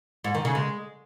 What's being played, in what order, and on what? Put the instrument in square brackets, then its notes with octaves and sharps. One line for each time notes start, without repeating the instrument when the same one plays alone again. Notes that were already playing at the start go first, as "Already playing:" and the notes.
[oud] G#2
D#3
C#3
G#3